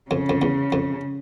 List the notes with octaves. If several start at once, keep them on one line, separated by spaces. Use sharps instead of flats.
F2 C#3
F2
E2
F2